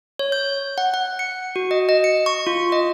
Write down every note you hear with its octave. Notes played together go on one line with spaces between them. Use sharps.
C#5
G6
F#5
F#5
C#7
F#4
D#5
D#5
C#7
C#6
F4
D#5